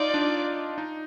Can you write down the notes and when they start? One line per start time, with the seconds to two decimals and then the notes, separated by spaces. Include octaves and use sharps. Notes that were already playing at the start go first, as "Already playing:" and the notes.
Already playing: D#4 F4 D5
0.14 D4
0.78 D#4